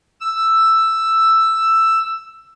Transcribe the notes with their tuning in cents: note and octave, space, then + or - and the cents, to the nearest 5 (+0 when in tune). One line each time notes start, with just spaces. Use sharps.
E6 +5